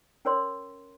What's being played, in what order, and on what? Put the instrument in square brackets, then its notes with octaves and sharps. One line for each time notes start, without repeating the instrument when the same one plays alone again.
[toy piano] C#4 A#4 C#5 C6